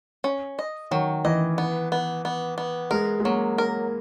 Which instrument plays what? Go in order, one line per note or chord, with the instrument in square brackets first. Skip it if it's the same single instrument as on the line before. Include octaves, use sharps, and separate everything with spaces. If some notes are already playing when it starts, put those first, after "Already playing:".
[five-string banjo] C#4
D#5
[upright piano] D#3 [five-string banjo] F#3
[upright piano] E3 [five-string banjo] D#5
[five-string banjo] B3
B3
B3
B3
[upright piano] G#3 [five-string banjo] A#4
[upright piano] G#3
[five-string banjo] F#3 [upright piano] A#3
[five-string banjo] A#4